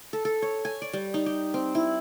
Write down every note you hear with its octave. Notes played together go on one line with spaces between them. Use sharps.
A4
A4
C#5
G#5
D5
G3
D#4
G4
C4
E4